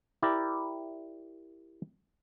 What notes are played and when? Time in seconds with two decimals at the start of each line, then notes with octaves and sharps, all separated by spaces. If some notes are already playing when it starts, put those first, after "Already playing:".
0.23 E4 G4 A#4 D5